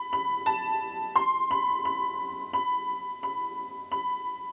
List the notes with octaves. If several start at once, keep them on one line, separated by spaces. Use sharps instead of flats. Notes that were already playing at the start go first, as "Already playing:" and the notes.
Already playing: B5
B5
A5
C6
B5
B5
B5
B5
B5